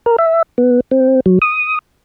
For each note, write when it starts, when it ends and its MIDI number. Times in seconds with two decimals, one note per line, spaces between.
0.06 0.16 70
0.18 0.42 76
0.58 0.80 59
0.91 1.20 60
1.26 1.39 54
1.42 1.79 87